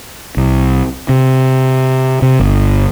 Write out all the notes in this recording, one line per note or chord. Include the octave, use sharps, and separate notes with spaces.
C2
C3
C3
G1